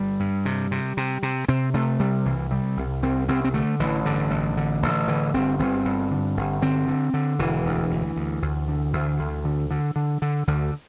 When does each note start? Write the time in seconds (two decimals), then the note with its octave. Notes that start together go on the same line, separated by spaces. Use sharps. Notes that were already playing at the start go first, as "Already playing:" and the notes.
Already playing: G1 G3
0.20 G2
0.45 C3
0.71 C3
0.97 C3
1.23 C3
1.48 C3 C4
1.74 C3 A3
2.00 C3 G3
2.25 C2 E3
2.51 C3 G3
2.77 C2
3.03 C2 C4
3.28 C2 C4
3.44 C4
3.54 D3 A3
3.79 A1 E3
4.05 G2 D3
4.31 A1
4.57 D3
4.82 A1
5.08 D3 E3
5.34 G1 C4
5.59 G1 C4
5.85 G2
6.11 D3
6.37 G1
6.62 D3 C4
6.88 D3
7.14 D3
7.39 E1 E3
7.65 D2
7.91 D2
8.17 D2
8.42 D2
8.68 D3
8.93 D2
9.19 D2
9.45 D3
9.71 D3
9.96 D3
10.22 D3
10.47 D2 D3